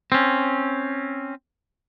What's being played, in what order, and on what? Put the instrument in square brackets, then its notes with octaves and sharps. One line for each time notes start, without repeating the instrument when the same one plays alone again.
[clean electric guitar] C4 C#4